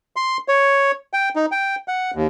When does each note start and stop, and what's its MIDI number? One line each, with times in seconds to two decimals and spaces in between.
0.16 0.37 84
0.48 0.91 73
1.13 1.29 79
1.36 1.46 63
1.52 1.76 79
1.88 2.11 78
2.15 2.27 39